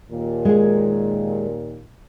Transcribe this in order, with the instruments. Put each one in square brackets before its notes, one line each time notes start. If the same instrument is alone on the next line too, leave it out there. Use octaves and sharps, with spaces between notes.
[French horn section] D#2 A#2
[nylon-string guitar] G#3 G#4